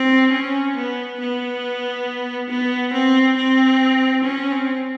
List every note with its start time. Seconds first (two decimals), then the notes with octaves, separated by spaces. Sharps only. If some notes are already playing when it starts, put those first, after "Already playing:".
Already playing: C4
0.32 C#4
0.75 B3
1.20 B3
2.49 B3
2.93 C4
3.37 C4
4.24 C#4
4.52 C4